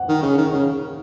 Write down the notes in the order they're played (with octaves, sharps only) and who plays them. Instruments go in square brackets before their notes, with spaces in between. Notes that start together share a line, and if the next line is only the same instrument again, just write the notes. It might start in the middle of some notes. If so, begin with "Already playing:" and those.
Already playing: [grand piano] F#5
[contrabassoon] D#3
C#3
D#3
C#3